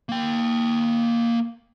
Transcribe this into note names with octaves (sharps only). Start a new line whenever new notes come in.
A#3 G5